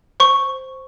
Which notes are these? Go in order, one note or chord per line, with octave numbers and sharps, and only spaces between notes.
C5 C#6